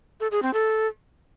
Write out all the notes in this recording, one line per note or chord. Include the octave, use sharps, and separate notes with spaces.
A4
G#4
C4
A4